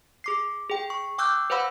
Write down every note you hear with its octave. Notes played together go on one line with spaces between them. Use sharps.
G#4 D6 C7
G#4 G5
C#6
G5 D6 E6 F#6 G6
B4 C5 F5 F#5 B5 E6